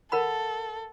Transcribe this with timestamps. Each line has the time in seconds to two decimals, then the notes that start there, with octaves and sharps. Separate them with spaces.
0.12 A4 A#4 F#5 B5